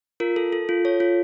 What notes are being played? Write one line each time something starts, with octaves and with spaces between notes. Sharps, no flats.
F4 A#4
A4
A4
F4
A4 C#5
F4